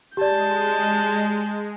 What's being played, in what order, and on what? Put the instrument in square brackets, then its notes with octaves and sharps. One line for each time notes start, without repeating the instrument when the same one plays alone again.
[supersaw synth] G#3 [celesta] G4 D5 [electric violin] A5 G6